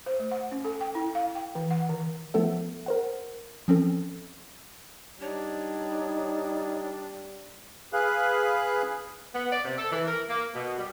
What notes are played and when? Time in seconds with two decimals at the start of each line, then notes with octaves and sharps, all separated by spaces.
0.06 C5
0.19 A3
0.31 F#5
0.51 C#4
0.65 A4
0.81 G5
0.95 E4
1.15 F5
1.35 G5
1.55 E3
1.71 F#5
1.89 D#3
2.34 F3 A3 B3 A4 E5
2.86 A#4 C5 F#5
3.68 F3 C4 C#4 A4
5.22 G3 D4 D#4 C#5
7.93 G#4 B4 F5 F#6
9.35 B3
9.52 D5
9.65 C3
9.78 A4
9.92 E3
10.07 A#4
10.29 A#3
10.55 B2
10.78 G3